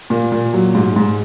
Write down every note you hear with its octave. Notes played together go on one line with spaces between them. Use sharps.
A#2
A#2
F#3
G#2
G#2